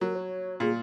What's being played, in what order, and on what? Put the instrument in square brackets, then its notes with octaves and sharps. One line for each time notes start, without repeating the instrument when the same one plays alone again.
[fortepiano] F#3 [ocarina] A#4
[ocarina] C#5
[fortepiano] A#2 [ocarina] G#4